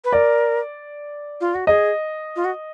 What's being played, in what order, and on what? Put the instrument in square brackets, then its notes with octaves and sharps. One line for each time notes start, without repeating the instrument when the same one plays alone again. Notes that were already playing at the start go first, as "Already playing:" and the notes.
[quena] B4
[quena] A#4 [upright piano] D5
[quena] F4
F#4
[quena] G#4 [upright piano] D#5
[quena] F4
F#4